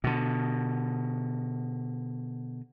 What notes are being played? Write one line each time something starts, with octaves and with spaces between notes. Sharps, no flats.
B2 D3